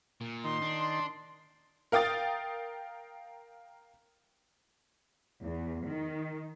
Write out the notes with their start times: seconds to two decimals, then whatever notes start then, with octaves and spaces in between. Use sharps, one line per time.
0.21 A#2
0.44 D#3 C6
0.62 D4
1.92 A#4 F5 G5 D#6 A6
5.42 E2
5.87 D#3